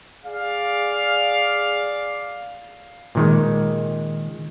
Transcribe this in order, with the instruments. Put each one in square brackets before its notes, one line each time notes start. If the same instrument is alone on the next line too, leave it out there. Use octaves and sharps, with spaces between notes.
[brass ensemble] G#4 D5 F5
[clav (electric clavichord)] A#2 D#3 G#3